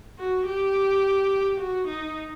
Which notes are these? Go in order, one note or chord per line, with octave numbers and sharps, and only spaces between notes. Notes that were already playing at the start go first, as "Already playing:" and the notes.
F#4
G4
F#4
D#4